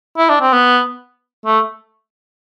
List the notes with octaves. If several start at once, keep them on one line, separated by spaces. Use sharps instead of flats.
E4
D4
C4
B3
A3